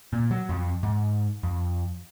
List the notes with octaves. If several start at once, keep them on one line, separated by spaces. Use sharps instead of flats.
A#2
F#3
F2
G#2
F2